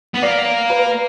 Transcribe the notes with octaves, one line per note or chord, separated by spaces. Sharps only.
B3
A#3 D5
B4